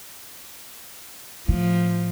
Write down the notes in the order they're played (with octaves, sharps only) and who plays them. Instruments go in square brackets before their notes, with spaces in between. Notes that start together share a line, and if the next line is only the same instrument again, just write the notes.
[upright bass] A2 [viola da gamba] F3